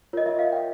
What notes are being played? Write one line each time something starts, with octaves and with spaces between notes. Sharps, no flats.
F4 A#4 C#5 D#5
E5
F5
G5